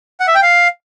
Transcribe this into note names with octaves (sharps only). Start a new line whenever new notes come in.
F#5
E5
G5
F5